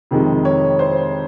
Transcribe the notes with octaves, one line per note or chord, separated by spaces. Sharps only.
F2 C3 D#3 G#3
C#5
C5